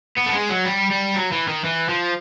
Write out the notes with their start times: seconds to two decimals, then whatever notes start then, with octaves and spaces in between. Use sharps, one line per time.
0.17 B3
0.26 A3
0.33 G#3
0.49 F#3
0.66 G3
0.91 G3
1.14 F#3
1.32 E3
1.48 D#3
1.64 E3
1.89 F3